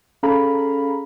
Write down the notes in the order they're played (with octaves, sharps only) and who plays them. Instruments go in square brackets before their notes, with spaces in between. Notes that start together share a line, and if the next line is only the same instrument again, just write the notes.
[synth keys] C#4 G#4 A4 F5 A#5 B5